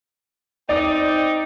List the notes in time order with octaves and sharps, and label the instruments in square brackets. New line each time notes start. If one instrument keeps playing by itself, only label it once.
[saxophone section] C4 D#4 [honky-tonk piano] D5